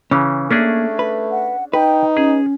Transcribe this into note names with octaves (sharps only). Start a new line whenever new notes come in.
C#3 E3 C#4
A3 A#3 C#4 D4 G#4
B4
F#5
D#4 B4 G5
C#4 G#4